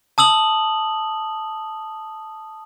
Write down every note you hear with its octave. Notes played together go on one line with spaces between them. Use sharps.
A5 D#6 E6 F#7